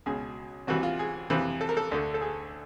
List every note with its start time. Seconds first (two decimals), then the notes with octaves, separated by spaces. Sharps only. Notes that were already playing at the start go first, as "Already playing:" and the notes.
0.06 C#2 B2 G#4
0.67 C2 C3 E3 F#4
0.83 F4
0.99 G#4
1.30 F2 C3 E3
1.61 A4
1.69 A#4
1.77 A4
1.91 D2 D3
2.14 A4
2.21 G#4